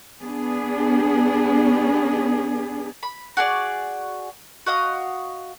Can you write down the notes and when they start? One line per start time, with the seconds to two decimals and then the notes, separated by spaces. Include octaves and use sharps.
0.21 B3 D4 G#4
3.03 B5
3.37 F#4 G#4 D5
4.66 F#4 D#5 F5 D#6